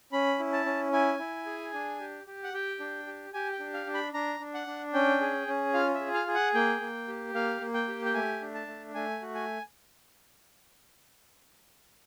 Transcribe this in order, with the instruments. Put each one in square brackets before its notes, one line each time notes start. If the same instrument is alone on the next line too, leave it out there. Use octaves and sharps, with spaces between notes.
[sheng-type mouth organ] C#4 B5
E4
A5
C#4
E4 G#5
E4
G#4
D4
G4
G4
F#5
G4 G5
D4
G4
G4 G#5
G5
D4
F5
D4
B5
D4 A#5
D4
F#5
D4
C#4 G5
G#4
C#4
F4 F5
E5
G#4
F5
G#4
F#5
A#3 G5
A#3
G4
A#3 F5
A#3
G5
G4
G5
A3 G#5
D4
A5
A3
A3 G#5
F#4
G#5